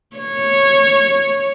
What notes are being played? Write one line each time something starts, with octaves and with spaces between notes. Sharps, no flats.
C#5